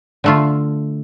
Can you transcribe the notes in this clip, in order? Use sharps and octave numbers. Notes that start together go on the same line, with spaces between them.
D3 A3 F4